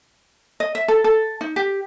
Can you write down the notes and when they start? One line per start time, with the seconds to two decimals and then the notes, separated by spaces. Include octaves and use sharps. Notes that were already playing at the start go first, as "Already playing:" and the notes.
0.60 D#5
0.75 E5
0.88 A4
1.04 A4
1.41 D#4
1.56 G4